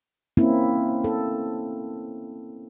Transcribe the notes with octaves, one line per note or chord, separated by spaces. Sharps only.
A#3 C4 C#4 E4
A4